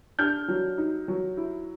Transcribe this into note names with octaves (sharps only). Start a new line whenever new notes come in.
D4 F6 G6
F#3
D#4
F#3
E4